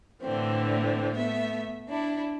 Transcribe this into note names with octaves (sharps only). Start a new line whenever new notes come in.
A2 D3 E3 C4
A3 B3 E5
D4 E4